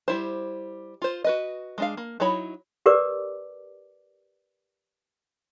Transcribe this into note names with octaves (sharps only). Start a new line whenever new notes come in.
G3 E4 C5
F4 C5
F#4 B4 D#5
G#3 D4 F5
A#3
F#3 D#4 E4 C#5 B5
G4 A#4 B4 D5 D6